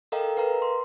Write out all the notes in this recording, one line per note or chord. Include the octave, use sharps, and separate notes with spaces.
A4 A#4 D#5 F5 G5 A#5
A#4 B4 F5 A#5
C6